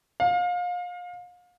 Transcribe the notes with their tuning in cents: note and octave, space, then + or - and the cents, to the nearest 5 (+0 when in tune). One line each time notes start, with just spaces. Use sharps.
F5 +30